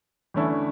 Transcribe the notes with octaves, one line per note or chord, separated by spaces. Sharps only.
E2 D3 A3 C#4 E4